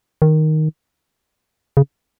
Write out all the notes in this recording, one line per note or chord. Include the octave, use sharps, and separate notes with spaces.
D#3
C#3